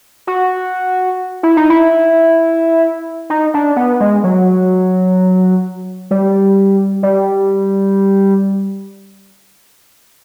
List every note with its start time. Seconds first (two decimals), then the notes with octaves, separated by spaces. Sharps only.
0.27 F#4
1.43 E4
1.57 D#4
1.70 E4
3.30 D#4
3.54 D4
3.76 B3
4.00 G#3
4.24 F#3
6.11 G3
7.03 G3